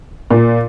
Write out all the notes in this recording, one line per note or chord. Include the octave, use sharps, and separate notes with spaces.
A#2